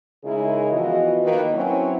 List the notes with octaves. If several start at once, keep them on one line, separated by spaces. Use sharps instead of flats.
C#3 G#3 D#4 E4 G#4 A#4
E3 F3 B3 F4 F#4 D#5
D#3 A#3 D#4 B4
F#3 C4 C#4 E4